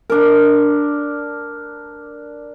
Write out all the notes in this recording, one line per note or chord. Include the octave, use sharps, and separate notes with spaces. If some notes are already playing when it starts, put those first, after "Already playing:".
D4 A#4